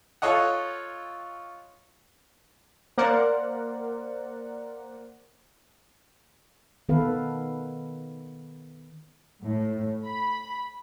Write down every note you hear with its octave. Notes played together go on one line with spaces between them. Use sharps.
F4 A4 C#5 D#5 F#5
A#3 A#4 C5 D5 F#5
D#3 B3 A4 B4 F5
A2
B5